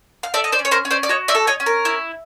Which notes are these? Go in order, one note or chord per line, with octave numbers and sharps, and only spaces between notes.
F5
A4 D5 E5
D#5
C5 D5
C#4
C#5
A#4 C5
C#4
C5 D5
D5
F#4 C#5 D#5
D5 E5
A4
C#5 D#5
C#4
A#4
E4